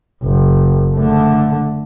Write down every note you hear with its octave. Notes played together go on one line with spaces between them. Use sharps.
F#1
D3 A3